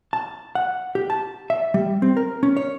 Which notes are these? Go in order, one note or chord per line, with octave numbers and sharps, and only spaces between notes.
A5
F#5
G4
A5
E5
G3
C4
A#4
C#4
C#5